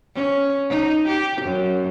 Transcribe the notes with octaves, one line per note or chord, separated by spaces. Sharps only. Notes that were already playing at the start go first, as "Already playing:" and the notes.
C#4
D#4
G4
F#2